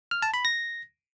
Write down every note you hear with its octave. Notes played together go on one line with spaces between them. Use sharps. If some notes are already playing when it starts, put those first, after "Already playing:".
F6
A5
B5
A#6